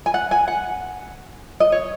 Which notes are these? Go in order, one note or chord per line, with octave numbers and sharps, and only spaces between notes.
G#5
F#5
G#5
F#5
D#5
C#5